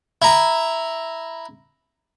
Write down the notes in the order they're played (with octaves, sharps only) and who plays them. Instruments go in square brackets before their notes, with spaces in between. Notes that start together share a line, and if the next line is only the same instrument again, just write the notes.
[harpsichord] E4 A#5